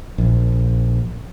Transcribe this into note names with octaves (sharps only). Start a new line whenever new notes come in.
A#1